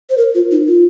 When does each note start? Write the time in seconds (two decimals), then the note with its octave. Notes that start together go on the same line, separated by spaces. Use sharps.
0.10 C5
0.18 A#4
0.35 F4
0.51 D#4
0.68 F4